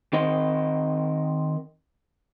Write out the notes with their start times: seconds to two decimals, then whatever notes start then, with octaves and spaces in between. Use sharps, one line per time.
0.13 D#3 C4 D#5